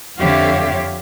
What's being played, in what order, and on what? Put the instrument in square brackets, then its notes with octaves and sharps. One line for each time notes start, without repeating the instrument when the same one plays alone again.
[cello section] F2 D3 G4 C#5 E5 F5